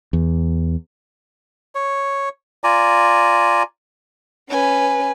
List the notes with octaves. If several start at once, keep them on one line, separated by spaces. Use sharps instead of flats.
E2
C#5
F4 D5 G#5 A#5
C#4 B4 G#5